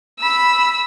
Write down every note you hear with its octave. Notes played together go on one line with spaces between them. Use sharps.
B5 E6